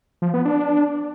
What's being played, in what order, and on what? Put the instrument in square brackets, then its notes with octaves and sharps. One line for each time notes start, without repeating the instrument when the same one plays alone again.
[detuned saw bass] F3
B3
D4